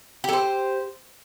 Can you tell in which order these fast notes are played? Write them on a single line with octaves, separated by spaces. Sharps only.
G4 A4 C5